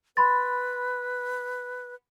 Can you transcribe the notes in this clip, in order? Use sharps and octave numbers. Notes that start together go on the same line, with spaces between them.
B4 B5 C6 A6